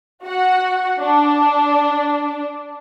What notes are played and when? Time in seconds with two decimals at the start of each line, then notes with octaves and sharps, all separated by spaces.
0.25 F#4 F#5
0.99 D4